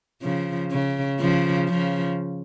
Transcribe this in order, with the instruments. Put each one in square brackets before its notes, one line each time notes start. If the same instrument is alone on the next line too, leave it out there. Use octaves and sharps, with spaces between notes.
[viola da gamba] C#3 F3
C#3
C#3 F3
C#3 F3